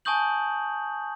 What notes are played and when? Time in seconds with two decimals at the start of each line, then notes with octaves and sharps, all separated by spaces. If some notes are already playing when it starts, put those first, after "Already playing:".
0.05 G#5 A5 C#6 D#6 G6 F#7